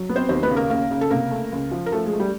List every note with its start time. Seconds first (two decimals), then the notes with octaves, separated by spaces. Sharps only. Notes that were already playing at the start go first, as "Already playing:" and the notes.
Already playing: F#3
0.09 B3
0.16 C4 C5
0.29 D#2 C4 C5
0.43 B3 B4
0.50 C#3
0.56 A#3 A#4
0.70 C#3 A#3 A#4
0.91 C#3
1.01 A4
1.10 C3 A#3 A#4
1.31 A3
1.52 C#2
1.71 F3
1.86 A#4
1.92 F3 A3 A4
2.06 G#3 G#4
2.13 A3
2.20 G3 G4